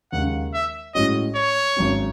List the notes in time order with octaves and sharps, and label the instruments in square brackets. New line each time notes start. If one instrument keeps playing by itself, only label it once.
[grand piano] D#2 C#3 G#3 [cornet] F#5
[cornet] E5
[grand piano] A2 G#3 C#4 F#4 [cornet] D#5
[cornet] C#5
[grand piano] G#1 G#2 F#3 C#4